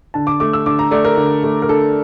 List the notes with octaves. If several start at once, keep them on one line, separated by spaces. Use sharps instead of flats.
D3 A5
D6
A3 D6
E6
D3 D6
A#5
A3 D5
A#4
D3
A3
A#4
D3 A4